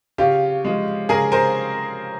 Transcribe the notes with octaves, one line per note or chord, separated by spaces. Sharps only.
C#3 F4 G4
F3 G#3
C#3 G#4 A#4
A#4 C5